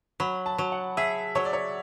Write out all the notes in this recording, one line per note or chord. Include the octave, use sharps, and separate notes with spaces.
F#3 B5
A5
F#3
F#5
G#4 E5
F#3 C#5
D5
C#5